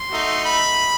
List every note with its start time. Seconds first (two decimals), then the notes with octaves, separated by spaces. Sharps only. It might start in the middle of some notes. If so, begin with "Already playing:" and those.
Already playing: C6
0.10 A3 D#4 F#4
0.45 B5